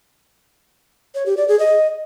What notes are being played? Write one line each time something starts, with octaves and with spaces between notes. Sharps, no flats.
C#5
G4
D5
G#4
D#5